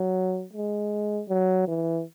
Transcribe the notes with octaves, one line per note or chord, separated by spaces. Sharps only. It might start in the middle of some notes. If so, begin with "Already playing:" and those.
Already playing: F#3
G#3
F#3
E3